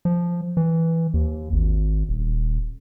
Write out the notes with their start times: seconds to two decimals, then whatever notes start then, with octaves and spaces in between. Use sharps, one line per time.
0.05 F3
0.57 E3
1.14 D#2
1.53 G#1
2.09 D#1